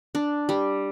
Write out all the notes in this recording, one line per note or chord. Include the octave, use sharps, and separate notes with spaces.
D4
G3